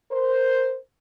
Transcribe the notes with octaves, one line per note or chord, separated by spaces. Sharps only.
A#4 C5